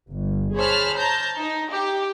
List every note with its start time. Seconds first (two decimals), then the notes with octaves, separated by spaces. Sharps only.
0.10 G1
0.56 G#4 C5 C#5 A5 B5 F6
0.97 A5 A#5 G6
1.40 D#4
1.72 G4